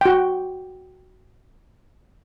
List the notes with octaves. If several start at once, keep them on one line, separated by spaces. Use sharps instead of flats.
F#4 G5